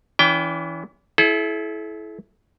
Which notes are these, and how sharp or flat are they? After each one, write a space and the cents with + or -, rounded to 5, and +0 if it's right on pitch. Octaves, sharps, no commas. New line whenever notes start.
E3 +0 C#4 +45 G5 +0
E4 +0 A4 -45 C#5 +0